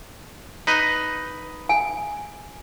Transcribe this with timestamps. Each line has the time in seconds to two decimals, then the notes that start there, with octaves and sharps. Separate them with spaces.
0.67 D#4 B4 D#5
1.69 G#5